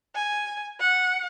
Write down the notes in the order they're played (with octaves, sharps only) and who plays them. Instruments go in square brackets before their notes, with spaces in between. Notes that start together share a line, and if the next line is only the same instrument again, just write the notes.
[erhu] G#5
F#5